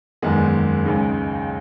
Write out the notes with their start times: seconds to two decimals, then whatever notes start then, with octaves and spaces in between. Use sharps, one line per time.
0.22 F#1 E2 D#3 G#3 B3
0.85 C#2 C#3 G#3 D#4